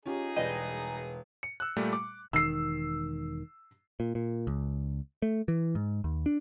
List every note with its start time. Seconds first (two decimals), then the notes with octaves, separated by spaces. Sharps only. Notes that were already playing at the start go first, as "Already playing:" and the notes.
0.06 C#4 D#4 F4 G4 G#4
0.36 E1 G3 B4 D#5 D#7
1.43 C#7
1.60 E6 F#6
1.77 A#2 G3 A3
1.93 D6
2.33 E1 D#3 E6 C7
4.00 A#2
4.15 A#2
4.47 C#2
5.22 A3
5.48 E3
5.75 G#2
6.04 D#2
6.26 D4